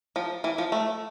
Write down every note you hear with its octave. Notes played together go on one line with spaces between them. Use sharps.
F3
E3
F3
A3